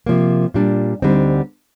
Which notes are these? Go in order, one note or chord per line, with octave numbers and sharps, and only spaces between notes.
C3 F3 A#3
A#2 G3 D4
D2 D3 G3 C4 D#4